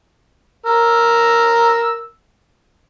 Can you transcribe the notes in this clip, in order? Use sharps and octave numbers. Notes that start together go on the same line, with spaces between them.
A#4 E6